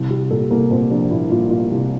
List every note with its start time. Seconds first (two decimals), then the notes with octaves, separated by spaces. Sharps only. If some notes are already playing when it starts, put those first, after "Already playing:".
Already playing: C2
0.10 C2 G4
0.30 A#2 A4
0.51 C2 A#3
0.71 A#2 C4
0.91 F3 D4
1.11 A#2 E4
1.31 A#2 F4
1.50 A#2 F4
1.71 C2